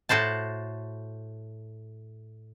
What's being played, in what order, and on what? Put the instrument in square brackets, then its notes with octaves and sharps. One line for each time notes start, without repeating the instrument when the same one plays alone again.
[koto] A2 F#4 C5 A5